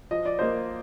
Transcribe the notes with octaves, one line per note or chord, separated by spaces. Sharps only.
F3 D#5
D5
A#3 C5 D#5